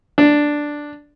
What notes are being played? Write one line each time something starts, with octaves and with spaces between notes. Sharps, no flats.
D4